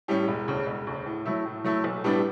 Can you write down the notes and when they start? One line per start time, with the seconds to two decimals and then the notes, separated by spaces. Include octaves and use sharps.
0.08 A2 G3 C#4
0.28 E1
0.48 D2 C#3
0.66 E1
0.87 D2 C#3
1.06 A2
1.25 F#3 A3 E4
1.46 A2
1.64 F#3 A3 E4
1.84 B1
2.04 A2 G3 B3 D4